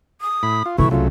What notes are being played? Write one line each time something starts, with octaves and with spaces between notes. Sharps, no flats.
D#6
A2 B5
F4
C2 E3 A3 E4 C#6
C#3 F#3 A3 F4